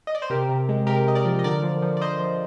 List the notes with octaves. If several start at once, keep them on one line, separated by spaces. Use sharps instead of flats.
D#5
D5
C5
C3 G4 A#4
C3
G#3
C3 G4 A#4
C3 D#5
A#4 D5
F3
D#5
D3 A#4 D5
F3
F3
D5
F3 C5 D#5
F3